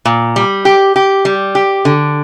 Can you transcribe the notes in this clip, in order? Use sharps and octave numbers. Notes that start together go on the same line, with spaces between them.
A#2
G3
G4
G4
G3
G4
D3